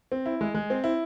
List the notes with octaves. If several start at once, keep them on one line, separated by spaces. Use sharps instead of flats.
C4
E4
G#3
G#3
C4
E4